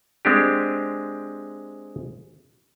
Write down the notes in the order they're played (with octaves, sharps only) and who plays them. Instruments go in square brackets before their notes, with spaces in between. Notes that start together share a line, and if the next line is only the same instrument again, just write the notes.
[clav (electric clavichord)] G#3 C4 D4 G4